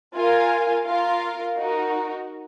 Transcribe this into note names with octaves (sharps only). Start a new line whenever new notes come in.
F4 A#4 F5 G#5
F4 A#4 F5
D#4 F#4 A#4